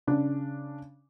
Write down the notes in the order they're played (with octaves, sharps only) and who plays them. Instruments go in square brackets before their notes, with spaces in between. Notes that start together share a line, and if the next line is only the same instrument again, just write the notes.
[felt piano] C#3 D4